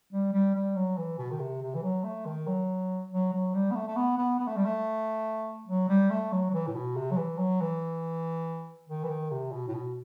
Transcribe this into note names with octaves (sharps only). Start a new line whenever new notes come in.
G3
G3
G3
F#3
E3
B2
D#3
C3
C3
E3
F#3
A3
D#3
F#3
F#3
F#3
G3
B3
A3
A3
B3
B3
B3
A3
G3
A3
F#3
G3
A3
F#3
F#3
E3
A2
B2
C3
F#3
E3
F#3
E3
D#3
E3
D#3
C3
B2
A2
B2